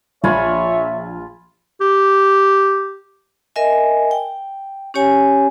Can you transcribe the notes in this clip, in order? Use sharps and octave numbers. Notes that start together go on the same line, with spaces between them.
A#1 F4 C#5 E5 G#5 B5
G4
A#4 D#5 E5 G#5
G5
C#4 G4 C#5 G#5